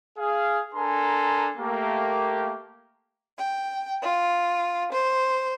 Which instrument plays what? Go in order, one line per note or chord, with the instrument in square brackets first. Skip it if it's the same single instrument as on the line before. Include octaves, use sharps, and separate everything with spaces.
[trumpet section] G#4 F5
D4 A4 A#4 G#5 A#5 C6
A3 A#3 G4
[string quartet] G5
F4
C5